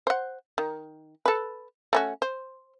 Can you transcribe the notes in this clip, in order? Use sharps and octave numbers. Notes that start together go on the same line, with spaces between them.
C5 F#5
D#3
A4 B4
A3 C#4 F#4
C5